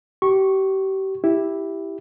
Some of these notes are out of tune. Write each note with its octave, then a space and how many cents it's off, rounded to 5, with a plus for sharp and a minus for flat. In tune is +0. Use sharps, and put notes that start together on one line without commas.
G4 -35 C#6 -15
E4 +0 G4 +0